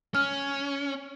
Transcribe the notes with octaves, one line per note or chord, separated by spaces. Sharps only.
C#4 F6